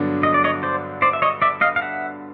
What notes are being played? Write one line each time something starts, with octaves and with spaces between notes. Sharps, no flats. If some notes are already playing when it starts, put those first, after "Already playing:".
Already playing: G2 D3 F#3 B3 D4
D#5
D5
C#5 D#5
C5 D5
C5 D5
E5
C#5 D#5
D5 E5
D#5 F5
F5
E5 F#5